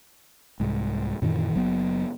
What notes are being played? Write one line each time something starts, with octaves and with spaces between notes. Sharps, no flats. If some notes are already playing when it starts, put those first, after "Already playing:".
C2 G#2
F#2 A#2 D#3 E3
F#1 F#3 B3